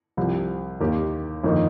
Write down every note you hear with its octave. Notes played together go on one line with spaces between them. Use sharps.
C2 C3 F3
D#2 D#3 A#3 G4
G1 F2 D#3 A#3 D#4